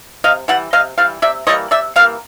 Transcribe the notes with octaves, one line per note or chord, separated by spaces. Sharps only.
C3 D#5 F5
E3 G3 F#5
C3 D#5 F5
E3 G3 F5
C3 D5 E5
E3 G3 A#3 C#5 D#5
C3 D5 E5
E3 G3 A#3 F5